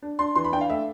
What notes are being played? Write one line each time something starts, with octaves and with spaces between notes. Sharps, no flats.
D4
D4 C6
E3 C6
B5
D4 G5
F5
A3 E5